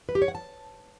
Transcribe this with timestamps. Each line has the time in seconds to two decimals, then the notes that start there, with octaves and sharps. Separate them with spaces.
0.09 B4
0.15 G4
0.22 C#5
0.28 F#5
0.35 A5